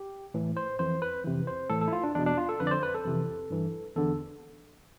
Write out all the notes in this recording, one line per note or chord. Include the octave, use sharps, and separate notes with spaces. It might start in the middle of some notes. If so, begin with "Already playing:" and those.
Already playing: G4
A2 E3
C5
F2 E3 C5
B4
F2 C3 E3
C5
A2 E3 A4
A4
E4
F4
D4
E2 B2 D4
D4
F4
A4
F2 D3 B4
D5
C5
B4
A4
F2 C3 E3
G2 E3
E2 D3 A4